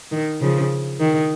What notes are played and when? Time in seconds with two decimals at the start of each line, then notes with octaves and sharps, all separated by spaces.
0.12 D#3
0.41 C#3 F3
1.00 D#3